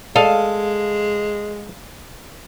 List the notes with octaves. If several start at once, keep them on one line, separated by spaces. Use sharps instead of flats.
G#3 A4 D#5 F5 A5